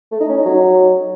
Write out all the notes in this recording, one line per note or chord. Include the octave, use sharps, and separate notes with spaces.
A3
D#4
C#4
D#4
F#3